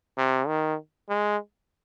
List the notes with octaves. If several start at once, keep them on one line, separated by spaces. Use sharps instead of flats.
C3
D#3
G#3